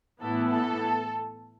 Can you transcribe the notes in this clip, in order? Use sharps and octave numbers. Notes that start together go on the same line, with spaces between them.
A2 E3 B3 E4 A4
A4